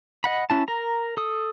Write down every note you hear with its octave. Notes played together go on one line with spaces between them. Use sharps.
D#5 F#5 B5
C#4 E4 A5
A#4 A#5
A4 D#6